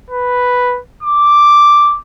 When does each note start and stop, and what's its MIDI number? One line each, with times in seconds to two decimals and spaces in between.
0.10 0.79 71
1.03 1.98 86